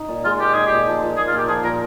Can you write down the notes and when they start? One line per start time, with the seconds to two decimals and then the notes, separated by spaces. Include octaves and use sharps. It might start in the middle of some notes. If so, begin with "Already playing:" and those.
Already playing: D#4
0.08 A#2
0.25 G#3 F4
0.39 A#2 G4
0.53 D#4 G#4
0.66 A#2 G4
0.87 F3
1.02 A#2
1.17 A#3 G#4
1.28 F4
1.32 A#2
1.38 G4
1.48 F3 G#4
1.63 A#2 A#4